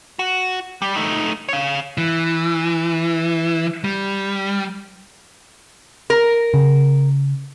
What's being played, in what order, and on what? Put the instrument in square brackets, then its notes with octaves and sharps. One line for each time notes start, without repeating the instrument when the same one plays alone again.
[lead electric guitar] F#4
G3
A3 D#4
C#5 F5
E3
G3
[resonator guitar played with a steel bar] A#4
[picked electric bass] C#3